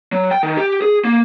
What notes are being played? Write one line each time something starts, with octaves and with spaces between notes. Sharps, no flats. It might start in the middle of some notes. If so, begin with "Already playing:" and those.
F#3
G5
D#3
G4
G#4
A#3